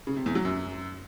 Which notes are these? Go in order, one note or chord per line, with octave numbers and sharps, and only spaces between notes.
C#3
C3
E2
F#3
F#2